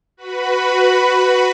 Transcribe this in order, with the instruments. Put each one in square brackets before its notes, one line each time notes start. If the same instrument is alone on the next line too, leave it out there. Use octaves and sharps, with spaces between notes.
[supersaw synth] F#4 B4 B5